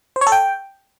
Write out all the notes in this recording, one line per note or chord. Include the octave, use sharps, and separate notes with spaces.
C5
C#5
A4
G5